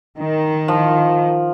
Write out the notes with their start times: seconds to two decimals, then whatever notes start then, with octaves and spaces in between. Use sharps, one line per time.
0.19 D#3
0.68 F3